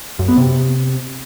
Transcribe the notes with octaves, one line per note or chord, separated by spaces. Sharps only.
F#2
B3
C3